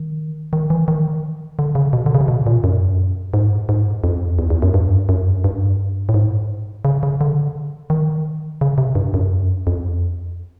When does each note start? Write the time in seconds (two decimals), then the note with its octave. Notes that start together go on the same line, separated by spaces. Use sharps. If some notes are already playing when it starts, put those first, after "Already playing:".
Already playing: D#3
0.53 D#3
0.70 E3
0.88 D#3
1.59 D3
1.75 C#3
1.93 B2
2.06 D3
2.15 C#3
2.21 C3
2.28 B2
2.47 A#2
2.64 F#2
3.34 G#2
3.69 G#2
4.04 F2
4.39 E2
4.50 E2
4.62 F#2
4.74 G2
5.09 F#2
5.44 G2
6.09 A2
6.14 G#2
6.85 C#3
7.03 C#3
7.21 D3
7.90 D#3
8.61 C#3
8.78 C3
8.95 G2
9.14 F#2
9.67 F2